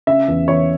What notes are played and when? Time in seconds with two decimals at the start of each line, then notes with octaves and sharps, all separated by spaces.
0.07 C#3 E5
0.28 E2
0.48 E2 C#5